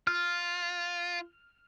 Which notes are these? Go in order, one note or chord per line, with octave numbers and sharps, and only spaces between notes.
F4 F6